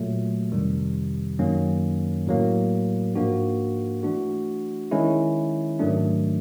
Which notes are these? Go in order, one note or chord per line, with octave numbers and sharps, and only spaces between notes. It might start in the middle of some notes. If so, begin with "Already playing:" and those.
Already playing: A#2 F#3 A3
F2 C3 D#3 G3
F#2 D#3 F#3 A#3 C#4
A2 F#3 A#3
G#2 F3 A#3 D4 F#4
E3 A3 D4 F#4
D#3 G#3 C#4 E4
G#2 D#3 F#3 A3 D4